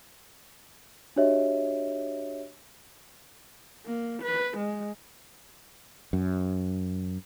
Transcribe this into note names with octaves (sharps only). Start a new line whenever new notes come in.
D4 F#4 G4 C#5 D#5 E5
A#3
B4
G#3
F#2